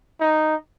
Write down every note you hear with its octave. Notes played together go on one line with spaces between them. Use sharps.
D#4